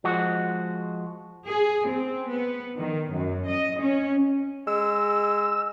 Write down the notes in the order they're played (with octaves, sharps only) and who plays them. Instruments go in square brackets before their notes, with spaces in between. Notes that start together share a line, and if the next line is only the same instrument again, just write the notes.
[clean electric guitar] F3 G#3 F#4
[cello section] G#4
C4
B3
D#3
F#2
D#5
C#4
[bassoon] G#3 [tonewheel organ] E6